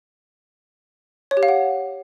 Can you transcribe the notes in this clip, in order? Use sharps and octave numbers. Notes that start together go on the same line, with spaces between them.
C#5
G4
F5
F#5